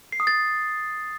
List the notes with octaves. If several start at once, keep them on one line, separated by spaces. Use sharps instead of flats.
C7
D#6
A6